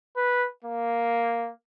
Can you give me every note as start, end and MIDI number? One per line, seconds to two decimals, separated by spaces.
0.16 0.47 71
0.64 1.49 58